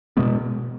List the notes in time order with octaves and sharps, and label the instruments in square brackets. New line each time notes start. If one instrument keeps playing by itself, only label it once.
[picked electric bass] B2 G#3 B3